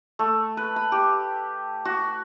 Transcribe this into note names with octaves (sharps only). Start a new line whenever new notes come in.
A3
B4
B5
G4
F#4